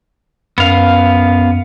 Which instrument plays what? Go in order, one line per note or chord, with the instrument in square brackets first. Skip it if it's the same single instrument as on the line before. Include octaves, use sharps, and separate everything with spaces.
[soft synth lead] F#2 [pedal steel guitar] B3 F5